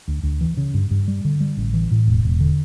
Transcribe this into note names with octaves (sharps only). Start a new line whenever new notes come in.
D2
D2
E3
C#3
G2
G2
G3
D3
G3
A1
E3
A2
E1
E1
D3